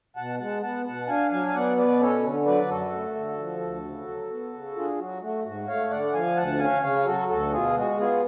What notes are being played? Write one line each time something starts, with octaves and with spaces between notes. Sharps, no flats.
B2 F#5 A5
G#3 F#5 A5
B3 F#5 A5
B2 F#5 A5
D4 F5 G#5
F#3 F5 G#5
F5
B3 D5 F#5
B2 B4 D5
C#4 A4 C#5
D3
F#3 B4 D5
F#2 F#4 A4
A3
D3
F3
D2
C#3
F#3
B3
C#3
D4 F4 G#4
F#3 F#4
A3 F#4
G#2 F#4
A3 C#5 F5
D3 D5 F#5
F#5
F3 F5 G#5
D2 F#5 A5
C#4 F5 G#5
C#3 C#5 F5
F#3 F#4 A4
D2 F#4 A4
B2 F4 G#4
G#3 F#4
B3 F4 G#4